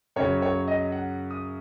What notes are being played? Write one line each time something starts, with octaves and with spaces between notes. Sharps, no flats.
F#2 C#3 F#3 C#5
C#5
D#5
F#5
D#6